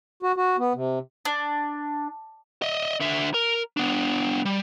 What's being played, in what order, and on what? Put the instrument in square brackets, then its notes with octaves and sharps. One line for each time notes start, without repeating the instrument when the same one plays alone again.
[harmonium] F#4
F#4
B3
C3
[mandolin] D4
[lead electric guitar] D#5 E5
D3 E5
A#4
B3 D4
G3